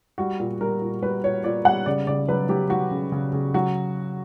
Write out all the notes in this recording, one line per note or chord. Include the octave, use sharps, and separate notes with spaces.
G3 F#4
A#2
G3 A#4
A#2
G3 B4
A#2 C#5
A#2 D5
G3 F#5
C#3 D5
C#3 D5
F#3 B4
F#3 G4
F#3 F#4
C#3
C#3
C#3
F#3 F#4